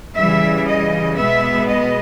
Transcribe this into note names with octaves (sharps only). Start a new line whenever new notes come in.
C#3 E3 G3 E5
D#5
B2 G#3 B3 E5
D#5